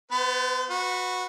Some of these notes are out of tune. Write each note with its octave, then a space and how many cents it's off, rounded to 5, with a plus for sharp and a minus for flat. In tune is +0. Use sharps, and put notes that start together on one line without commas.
B3 +20 C5 -35
F#4 -20 B4 +0